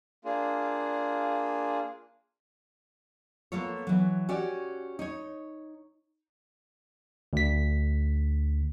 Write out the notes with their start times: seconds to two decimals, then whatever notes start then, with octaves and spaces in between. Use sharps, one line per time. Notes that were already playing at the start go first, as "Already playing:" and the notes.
0.25 A#3 D4 F4 G#4
3.52 A#3 B3 F4 A4 C#5
3.87 E3 F#3
4.29 C#4 F#4 G4 D5
4.99 D#4 C#5
7.33 D2 B6